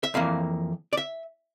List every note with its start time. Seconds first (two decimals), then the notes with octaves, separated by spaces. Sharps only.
0.03 E5
0.14 F2 E3 A#3 F5
0.93 D5
0.97 E5